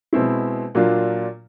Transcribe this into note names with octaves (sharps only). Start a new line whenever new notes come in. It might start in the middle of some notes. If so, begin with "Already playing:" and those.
B2 G#3 C4 E4
A#2 F#3 A#3 D4 F4